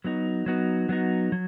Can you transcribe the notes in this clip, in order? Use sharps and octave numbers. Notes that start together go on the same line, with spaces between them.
F#3 B3 D#4 F#4
F#3 B3 D#4 F#4
F#3 B3 D#4 F#4
F#3